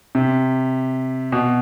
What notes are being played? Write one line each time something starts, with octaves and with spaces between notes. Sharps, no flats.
C3
B2